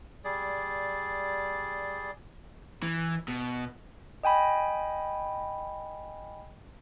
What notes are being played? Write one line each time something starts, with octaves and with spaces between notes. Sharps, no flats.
G3 G#4 D5
E3
B2
D#5 G5 G#5 B5